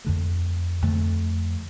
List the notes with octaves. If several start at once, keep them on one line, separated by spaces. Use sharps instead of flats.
F2 D3 A3
F2 D3 A3